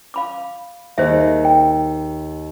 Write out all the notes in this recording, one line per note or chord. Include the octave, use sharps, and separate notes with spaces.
F5 B5 D6
D#2 G#4 C5 E5
G5